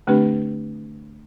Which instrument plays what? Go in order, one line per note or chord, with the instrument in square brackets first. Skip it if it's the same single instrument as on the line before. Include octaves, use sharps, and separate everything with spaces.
[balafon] D3 A3 C4 D4 G4 B4